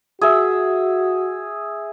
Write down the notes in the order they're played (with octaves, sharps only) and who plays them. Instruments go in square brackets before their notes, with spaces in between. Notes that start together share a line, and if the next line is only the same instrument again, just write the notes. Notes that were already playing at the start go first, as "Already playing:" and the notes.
[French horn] F#4 [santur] G#4 E5